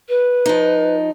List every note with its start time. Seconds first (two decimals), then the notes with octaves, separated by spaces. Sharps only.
0.09 B4
0.46 F3 D#4